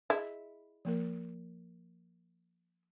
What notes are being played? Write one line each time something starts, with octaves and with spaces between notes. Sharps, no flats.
E4 G#4 D#5
F3 A#3 A#4